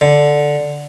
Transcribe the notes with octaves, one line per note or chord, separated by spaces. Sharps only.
D3